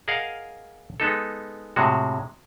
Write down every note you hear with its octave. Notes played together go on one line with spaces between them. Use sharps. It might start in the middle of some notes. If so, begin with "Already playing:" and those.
G#4 A#4 D#5 F5 F#5
G#3 B3 D#4 A4
A2 C3 G#3 F#4